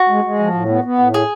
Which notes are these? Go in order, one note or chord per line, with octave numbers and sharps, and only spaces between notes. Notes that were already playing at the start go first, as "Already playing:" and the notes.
Already playing: F#4
G#3
G#3
F3
A2
B3
B3
A2
G#4